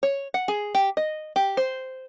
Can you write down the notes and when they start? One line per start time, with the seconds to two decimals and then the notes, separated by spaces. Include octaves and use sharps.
0.03 C#5
0.34 F#5
0.48 G#4
0.75 G4
0.97 D#5
1.36 G4
1.57 C5